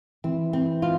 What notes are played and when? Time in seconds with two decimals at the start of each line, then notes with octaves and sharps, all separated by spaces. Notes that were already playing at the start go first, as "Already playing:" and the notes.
0.24 E3 C4
0.53 C4
0.82 F4